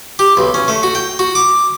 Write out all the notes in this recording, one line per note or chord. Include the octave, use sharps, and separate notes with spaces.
G4
B1
C#4
A3
F#4
G5
F#4
D6